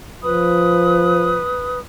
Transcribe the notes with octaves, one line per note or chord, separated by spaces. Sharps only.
F3 B4 B5 D#6